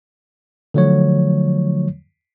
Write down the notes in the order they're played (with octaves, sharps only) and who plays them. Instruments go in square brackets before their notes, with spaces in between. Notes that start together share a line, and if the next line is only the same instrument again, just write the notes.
[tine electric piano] D3 F3 F#3 A3 C#5